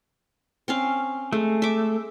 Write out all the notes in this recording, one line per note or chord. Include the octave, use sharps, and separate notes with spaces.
C4 C#4 F5
G#3 A3
E5 D6